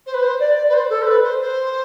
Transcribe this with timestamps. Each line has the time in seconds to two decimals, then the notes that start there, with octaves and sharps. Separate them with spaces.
0.06 C5
0.14 B4
0.22 C5
0.40 D5
0.69 B4
0.73 C5
0.89 A4
1.02 C5
1.06 B4
1.23 C5
1.40 C5